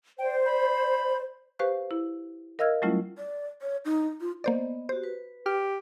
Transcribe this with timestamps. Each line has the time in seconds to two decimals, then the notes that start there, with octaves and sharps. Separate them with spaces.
0.19 C5 D5 G5
0.46 B5
1.59 G4 B4 C5 F5 C#6 F#6
1.91 E4
2.59 A#4 D#5 F5 E6 F6 G#6
2.82 F#3 G3 A3 C#4 E4 F4
3.18 D5
3.62 C#5
3.85 D#4
4.20 F4
4.44 A#3 B3 C5 D5 D#5
4.89 F#4 G4 C5
5.04 B4
5.46 G4 F6